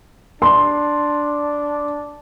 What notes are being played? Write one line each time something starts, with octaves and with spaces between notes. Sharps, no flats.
D4 C6